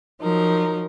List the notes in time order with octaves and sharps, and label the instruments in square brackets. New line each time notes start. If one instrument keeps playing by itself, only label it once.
[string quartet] F3 F#3 D#4 A#4